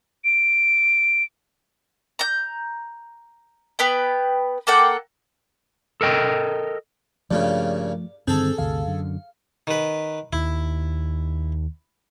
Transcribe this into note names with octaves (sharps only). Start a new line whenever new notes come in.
D7
A#5 G6
B3 B4 G5
A#3 A4 F#5 G5
A4 A#4 D#5 G5
G2 A#2 C#3 F3 A3 D5
G2 D3 D#3 C4 G#4 A4
G1 D2 C3 F5
F#2 D3
D#3 B4
D#2 E4